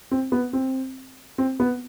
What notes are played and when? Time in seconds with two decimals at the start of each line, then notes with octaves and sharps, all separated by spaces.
0.11 C4
0.32 B3
0.53 C4
1.38 C4
1.60 B3